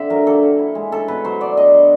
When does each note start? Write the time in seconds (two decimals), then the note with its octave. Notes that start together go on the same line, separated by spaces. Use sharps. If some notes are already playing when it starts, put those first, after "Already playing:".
Already playing: D3 C4 E5
0.10 F#3 A#4
0.26 A#3 A4
0.43 D3
0.59 E4
0.75 G#3
0.92 C#4 A4
1.08 B2 B4
1.24 F#3 C5
1.41 B3 D5
1.57 D4 D#5
1.74 F#3